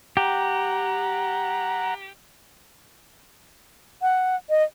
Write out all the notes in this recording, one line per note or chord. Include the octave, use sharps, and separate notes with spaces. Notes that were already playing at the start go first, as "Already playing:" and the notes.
G4 F#5 A#5
F#5
D#5